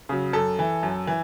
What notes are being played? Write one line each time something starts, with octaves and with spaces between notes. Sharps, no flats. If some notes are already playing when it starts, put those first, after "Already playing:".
C#3 F#3
F#2 A4
E3
F#2
E3